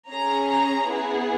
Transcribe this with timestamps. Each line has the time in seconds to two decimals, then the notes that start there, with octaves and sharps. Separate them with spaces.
0.10 C#4 G#4 A#5
0.49 A#5
0.89 B3 E4 G#4